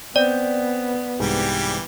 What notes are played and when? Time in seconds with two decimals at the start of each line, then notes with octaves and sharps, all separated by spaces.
0.16 B3 C4 D5
1.20 C2 G#2 E3 G3 G4